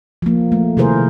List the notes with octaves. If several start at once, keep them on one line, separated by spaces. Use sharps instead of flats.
F3 A#3
A3
C3 D#3 E4 G#4 A#4 C5